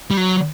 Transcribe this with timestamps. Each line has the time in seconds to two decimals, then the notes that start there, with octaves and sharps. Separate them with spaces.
0.11 G3
0.17 F#3